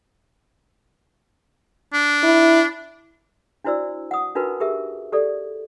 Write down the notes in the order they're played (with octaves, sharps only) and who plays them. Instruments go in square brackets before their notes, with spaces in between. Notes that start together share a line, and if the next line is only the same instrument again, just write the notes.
[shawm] D4
[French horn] E4
[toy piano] D4 E4 F#4 C5 D5 E6
F#5 D#6
D4 D#4 F4 F#4 A#4 B4
G4 G#4 A#4 E5
G4 A4 D5